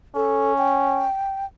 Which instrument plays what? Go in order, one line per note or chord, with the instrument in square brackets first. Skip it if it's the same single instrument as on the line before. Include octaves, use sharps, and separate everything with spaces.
[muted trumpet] C#4 [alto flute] A4
[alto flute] G5